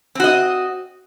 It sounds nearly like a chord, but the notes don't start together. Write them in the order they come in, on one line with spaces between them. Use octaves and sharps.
C4 F#4 D#5